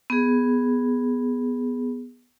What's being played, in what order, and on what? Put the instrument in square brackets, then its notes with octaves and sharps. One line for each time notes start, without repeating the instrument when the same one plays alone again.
[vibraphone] B3 G#4